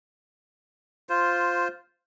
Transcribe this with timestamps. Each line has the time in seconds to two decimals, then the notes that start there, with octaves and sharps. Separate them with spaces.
1.09 F4 C5